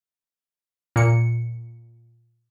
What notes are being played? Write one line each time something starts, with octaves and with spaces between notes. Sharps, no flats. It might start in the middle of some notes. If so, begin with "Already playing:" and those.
A#2 C#7